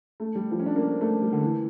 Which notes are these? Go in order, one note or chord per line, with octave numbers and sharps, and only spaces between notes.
A3
G3
F3
C#4
D4
A#3
C#4
A3
G3
D3
E3